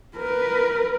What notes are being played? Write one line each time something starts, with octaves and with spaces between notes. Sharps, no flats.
A#4 B4